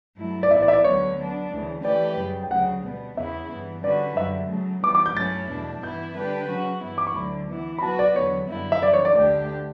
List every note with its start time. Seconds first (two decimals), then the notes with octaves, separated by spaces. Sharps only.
0.18 G2 F#3 A3 E4
0.43 D5
0.51 A2 E3 B3 E4 E5
0.62 D5
0.68 E5
0.73 D5
0.84 D2 D3 F#3 B3 C#5
1.17 F#3 B3 D4
1.52 D2 C#3 E3
1.84 E3 A3 C#4 G4 B4 D5
2.18 F#2 C#3 G3
2.43 G5
2.51 D2 C#3 F#3 F#5
2.83 B2 G3 B3
3.17 E2 C#3 E3 B3 E4 E5
3.50 G2 E3 B3
3.84 D3 G3 C#4 F#4 B4 D5
4.17 F#2 D3 G3 E5
4.50 C#3 F#3 A3
4.83 E3 G3 B3 D6
4.95 D6
5.06 G6
5.16 G2 F#3 A3 C#4 E4 A6
5.50 E2 B2 A3 D4
5.83 G2 E3 B3 E4 G6
6.16 D3 G3 D4 G4 B4
6.49 C#3 F#3 C#4 F#4
6.83 G2 E3 B3 E4
6.98 D6
7.07 C#6
7.15 D2 D3 F#3 B5
7.50 E3 B3 E4
7.78 B5
7.83 F#3 B3 F#4 B4 A5
7.99 D5
8.16 E2 D3 F#3 B3 C#5
8.49 F#2 D3 G3 B3 E4
8.72 E5
8.82 C#3 E3 G3 D5
8.93 C#5
9.05 D5
9.15 D2 D3 A3 D4 G4 D5